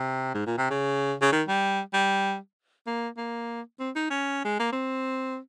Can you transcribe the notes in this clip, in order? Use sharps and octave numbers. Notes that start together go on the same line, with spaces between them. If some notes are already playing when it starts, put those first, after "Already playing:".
Already playing: C3
G#2
A#2
C3
C#3
C#3
D#3
G3
G3
A#3
A#3
C4
D#4
C#4
G#3
A#3
C4